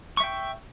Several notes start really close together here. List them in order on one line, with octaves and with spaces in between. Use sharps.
C#6 E5 G5